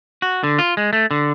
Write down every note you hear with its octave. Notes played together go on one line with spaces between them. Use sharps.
F#4
D3
F4
G#3
A3
D3